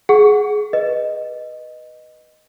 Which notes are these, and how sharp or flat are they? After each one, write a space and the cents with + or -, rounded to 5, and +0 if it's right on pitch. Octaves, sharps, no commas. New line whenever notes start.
G#4 +15 F#5 +0 C#6 +0
B4 -5 D#5 -10